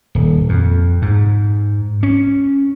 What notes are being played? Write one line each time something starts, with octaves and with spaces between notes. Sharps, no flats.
D#1
F2
G#2
C#4